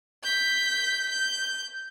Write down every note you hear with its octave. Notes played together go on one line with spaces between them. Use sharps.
G6 B6
G6